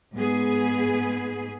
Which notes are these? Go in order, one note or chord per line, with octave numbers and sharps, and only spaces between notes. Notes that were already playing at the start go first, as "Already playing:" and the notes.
G#2 B3 G#4